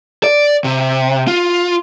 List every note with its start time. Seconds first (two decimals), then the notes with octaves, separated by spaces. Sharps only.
0.24 D5
0.64 C3
1.27 F4